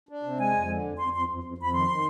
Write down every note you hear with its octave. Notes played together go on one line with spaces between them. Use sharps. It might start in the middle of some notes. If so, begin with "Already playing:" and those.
D4
C3
G#3 G#5
F2
D3
F2
F2 C6
F2 C6
F2
F2
F2
B5
D#3 C6
D#3